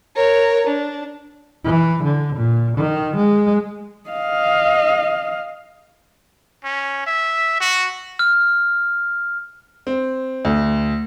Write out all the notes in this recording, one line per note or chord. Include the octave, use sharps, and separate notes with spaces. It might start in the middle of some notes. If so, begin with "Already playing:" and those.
A#4 C#5
D4
E3
D3
A#2
D#3
G#3
D#5 F5
C#4
E5
F#4
F6
C4
D2